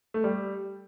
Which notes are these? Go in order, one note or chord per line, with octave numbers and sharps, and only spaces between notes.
A3
G3